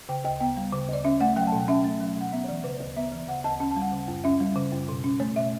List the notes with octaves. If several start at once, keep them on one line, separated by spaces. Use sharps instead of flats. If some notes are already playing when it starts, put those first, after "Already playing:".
C#3 G5
D2 G5
B3 G5
G3
C#3
D2 D5
C#4 E5
A3 F#5
F#3 G5
A5
B2
G5
C#4 E5
A3
F#3
B2 F#5
B3 E5
C#5
E3 D5
C#3 B4
D2 D5
B3 E5
E3
C#3 F#5
D2 A5
C#4 A5
A5
G3
F#5
C#3
F#2
C#4 E5
G3
C#3
F#2
B2
C#4
A3 C#5
B2 E5